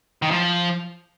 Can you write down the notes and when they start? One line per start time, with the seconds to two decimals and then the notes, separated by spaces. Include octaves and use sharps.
0.22 D#3
0.31 F3